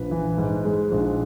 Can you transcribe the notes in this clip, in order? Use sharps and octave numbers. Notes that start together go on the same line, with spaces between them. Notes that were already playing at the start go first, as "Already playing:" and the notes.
Already playing: A#1 B4
E3
G#2
G#3
A#1